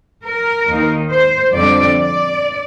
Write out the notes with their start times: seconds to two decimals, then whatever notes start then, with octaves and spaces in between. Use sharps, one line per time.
0.24 A#4
0.68 D#2 D#3 A#3 D#4
1.10 C5
1.53 F2 D3 G3 C4 D5
1.96 D5